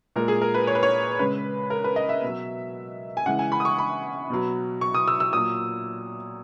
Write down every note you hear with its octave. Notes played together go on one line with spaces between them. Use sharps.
A#2 G#3 A#4
G#4
A#4
B4
C#5
B4
C#5
C#3 G#3 B4
A#4
B4
D#5
E5
B2 F#3
G#5
C#3 E3 G#3 F#5
G#5
B5
D#6
C#6
B5
B2 F#3
C#6
D#6
E6
E6
A#2 F#3 D#6